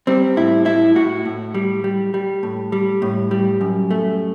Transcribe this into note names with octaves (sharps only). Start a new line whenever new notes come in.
G3 C4
A2 E4
A2 E4
A2 F#4
A2
G3
G3
G3
A2
G3
A2
G3
F#2
A3